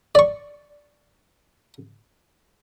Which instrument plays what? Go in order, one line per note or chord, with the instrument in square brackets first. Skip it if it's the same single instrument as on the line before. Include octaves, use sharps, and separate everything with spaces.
[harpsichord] D5 C#6